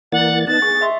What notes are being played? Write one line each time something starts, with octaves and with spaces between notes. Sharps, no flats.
E3 A#3 D5 F#5 A6
B3 D#4 A5 F#6 A6
G#4 C#6
D#5 E5 C6